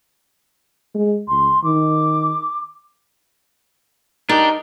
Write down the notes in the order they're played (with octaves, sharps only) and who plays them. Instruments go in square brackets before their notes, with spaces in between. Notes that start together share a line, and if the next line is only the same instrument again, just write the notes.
[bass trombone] G#3
[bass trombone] C#2 [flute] C6
[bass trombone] D#3 [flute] D6
[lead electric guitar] D4 G4 [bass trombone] D#4 [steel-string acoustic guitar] A#4